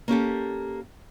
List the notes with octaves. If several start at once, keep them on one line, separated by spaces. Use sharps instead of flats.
A#3 C#4 G4 A4